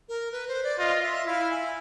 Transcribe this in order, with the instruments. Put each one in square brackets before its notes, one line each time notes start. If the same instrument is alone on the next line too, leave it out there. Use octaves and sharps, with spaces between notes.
[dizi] A#4
B4
C5
D5
[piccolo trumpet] F4 [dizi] D#5
[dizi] E5
[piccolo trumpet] E4 [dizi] F5
[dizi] G#5